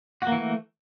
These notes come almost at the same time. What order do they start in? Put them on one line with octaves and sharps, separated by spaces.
F#4 A#3 E3 A3